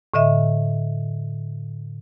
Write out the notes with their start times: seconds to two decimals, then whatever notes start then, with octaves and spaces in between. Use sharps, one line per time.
0.14 A2 D3 D#5 E5